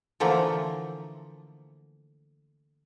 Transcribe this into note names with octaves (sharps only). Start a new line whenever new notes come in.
D3 E3 F3 A3 A#3